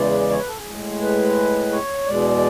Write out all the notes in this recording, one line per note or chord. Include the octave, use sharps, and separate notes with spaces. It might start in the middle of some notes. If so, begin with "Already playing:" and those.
Already playing: E2 C#3 E3 G#3 D5
C#5
B4
A4
G#4
A2 G#3
B4
C#5
E2 B2 G#3 D5